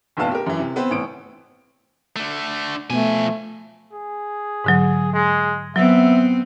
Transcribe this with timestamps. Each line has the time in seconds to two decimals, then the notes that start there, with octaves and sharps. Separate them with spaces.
0.17 F1 A#1 B3 F5 A5
0.31 G4 A#4
0.46 F#2 E3
0.59 C3
0.76 B3 C4 B4 C5
0.91 A1 D7
2.16 D3 A3
2.90 B2 F3 A3 B3 G#5
3.92 G#4
4.64 G#2 D3 F#3
5.13 G#3
5.76 F#3 B3 C4 E5